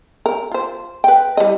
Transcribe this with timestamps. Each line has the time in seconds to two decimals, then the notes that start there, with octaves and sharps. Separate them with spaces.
0.26 A#4
0.51 F4 C5
1.04 B4 G5
1.37 G3 E4 D#5